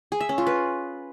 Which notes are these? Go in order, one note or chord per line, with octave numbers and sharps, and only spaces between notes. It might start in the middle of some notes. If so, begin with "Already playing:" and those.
G#4
E5
C#4
F4
B4